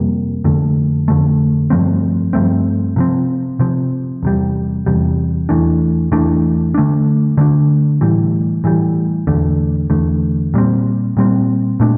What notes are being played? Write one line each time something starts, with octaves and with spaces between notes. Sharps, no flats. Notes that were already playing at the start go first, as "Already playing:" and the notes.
Already playing: F2 C3 G3 A#3
F2 D3 A3
F2 D3 A3
G2 F3 A3 C4
G2 F3 A3 C4
C3 F3 C4
C3 F3 C4
E2 C3 G3
E2 C3 G3
E2 E3 A3 D4
E2 E3 A3 D4
D3 A3 D4
D3 A3 D4
A2 E3 G3
A2 E3 G3
E2 D3 A3
E2 D3 A3
A#2 G3 C4
A#2 G3 C4
A#2 A3 D4